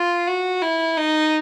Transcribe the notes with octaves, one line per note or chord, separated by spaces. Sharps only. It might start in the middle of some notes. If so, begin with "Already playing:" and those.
Already playing: F4
F#4
E4
D#4